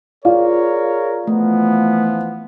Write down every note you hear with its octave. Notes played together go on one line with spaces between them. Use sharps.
F4 G#4 A#4 C#5 D5
E3 F3 A3 B3